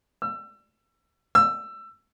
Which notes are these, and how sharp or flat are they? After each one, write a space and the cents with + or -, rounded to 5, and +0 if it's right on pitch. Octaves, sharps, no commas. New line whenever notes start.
E6 +30
E6 +20